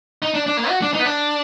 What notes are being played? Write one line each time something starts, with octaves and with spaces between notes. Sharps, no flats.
D#4
D4
D4
A#3
F#4
D4
D#4
B3
D4